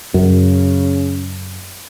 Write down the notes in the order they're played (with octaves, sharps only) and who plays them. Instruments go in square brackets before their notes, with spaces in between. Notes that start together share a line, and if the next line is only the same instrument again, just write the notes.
[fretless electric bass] F#2 [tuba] C#3